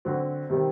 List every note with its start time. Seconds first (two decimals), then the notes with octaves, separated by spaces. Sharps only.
0.05 D3 F#3 C4 F#4
0.50 C3 D#3 G3 C4